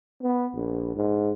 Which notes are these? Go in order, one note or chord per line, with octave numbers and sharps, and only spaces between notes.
B3
A#1
G#2